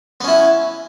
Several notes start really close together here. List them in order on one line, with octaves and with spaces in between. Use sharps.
B3 C#4 E4